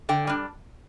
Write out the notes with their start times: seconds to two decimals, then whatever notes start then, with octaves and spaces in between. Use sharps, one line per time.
0.09 D3 G5
0.27 G3 D4